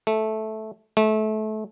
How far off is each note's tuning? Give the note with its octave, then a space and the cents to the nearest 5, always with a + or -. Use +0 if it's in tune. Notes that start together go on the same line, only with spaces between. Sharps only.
A3 -10
A3 -25